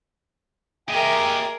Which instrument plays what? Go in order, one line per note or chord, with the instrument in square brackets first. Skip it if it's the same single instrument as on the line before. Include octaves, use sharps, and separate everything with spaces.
[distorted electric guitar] G4 D#5 [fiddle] G#4 A#4 [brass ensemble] E5 G5